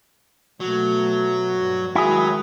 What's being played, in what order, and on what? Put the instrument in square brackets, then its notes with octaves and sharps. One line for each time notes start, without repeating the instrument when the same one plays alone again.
[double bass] B2 A3 [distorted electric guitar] F#3
[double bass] G2
[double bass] D#3 G#3 [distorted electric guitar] F#3 [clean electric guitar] E4 G#4